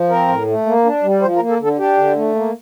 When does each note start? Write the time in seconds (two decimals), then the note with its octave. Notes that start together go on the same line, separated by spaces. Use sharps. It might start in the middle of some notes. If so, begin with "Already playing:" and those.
Already playing: F3
0.09 C4 A#4
0.28 A2
0.47 A3
0.66 A#3
0.85 D4
1.03 G3
1.22 F3 C5
1.36 A#4
1.41 A#3
1.49 A4
1.60 D3 A4
1.78 D4 G4
1.97 D3
2.16 A3
2.35 A#3